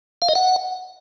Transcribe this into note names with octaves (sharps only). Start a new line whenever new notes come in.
F5
D#5
F#5